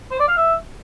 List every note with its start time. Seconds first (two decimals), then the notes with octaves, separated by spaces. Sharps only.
0.11 C5
0.20 D5
0.28 F5
0.37 E5